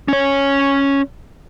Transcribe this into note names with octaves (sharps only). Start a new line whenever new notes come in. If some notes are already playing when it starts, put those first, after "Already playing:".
C#4 C#5